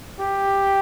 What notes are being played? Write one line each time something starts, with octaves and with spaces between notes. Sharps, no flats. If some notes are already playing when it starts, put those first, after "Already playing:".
G4